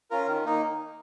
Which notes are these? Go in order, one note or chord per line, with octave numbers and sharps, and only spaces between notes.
C#4 F4 A#4
D#3
A#3 D#4